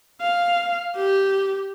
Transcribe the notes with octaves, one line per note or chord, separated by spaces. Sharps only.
F5
G4